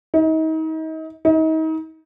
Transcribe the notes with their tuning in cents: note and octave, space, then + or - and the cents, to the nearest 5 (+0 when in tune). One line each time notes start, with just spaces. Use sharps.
D#4 +35
D#4 +35